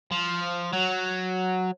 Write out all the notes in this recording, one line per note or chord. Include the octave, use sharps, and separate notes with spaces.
F3
F#3